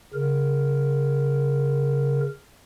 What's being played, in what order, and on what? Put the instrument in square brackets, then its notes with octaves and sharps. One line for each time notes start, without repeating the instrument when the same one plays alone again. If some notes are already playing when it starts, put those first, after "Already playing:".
[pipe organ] C#3 A#4